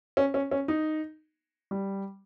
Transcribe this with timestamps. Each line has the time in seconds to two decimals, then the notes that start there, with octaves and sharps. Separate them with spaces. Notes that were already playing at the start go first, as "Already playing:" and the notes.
0.17 C#4
0.34 C#4
0.51 C#4
0.68 D#4
1.71 G3